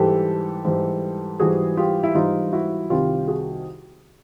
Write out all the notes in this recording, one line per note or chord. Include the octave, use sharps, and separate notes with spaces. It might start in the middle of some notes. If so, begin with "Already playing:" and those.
Already playing: G#2 E3 G3 G4 A4
G#2 E3 G3
G#2 E3 G3 F#4 G#4
F4 G4
E4
G#2 E3 G3 D#4 F4
E4 F#4
C2 C3 D#3 F4 G4
F#4 G#4